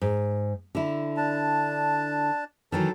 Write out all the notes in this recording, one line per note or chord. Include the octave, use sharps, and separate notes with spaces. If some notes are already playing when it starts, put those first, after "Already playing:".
G#2
D3 E4
D4 A5
D#3 E3 F#3 A4 A5